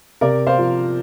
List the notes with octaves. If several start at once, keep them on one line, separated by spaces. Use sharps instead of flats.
C3 A#4 D5
C5 F5
F3